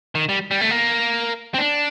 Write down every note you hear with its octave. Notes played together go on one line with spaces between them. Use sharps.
D#3
G3
G3
A3
A#3
C4
D4